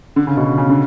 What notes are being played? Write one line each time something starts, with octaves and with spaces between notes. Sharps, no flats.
D3
C#3
B2
C#3
D3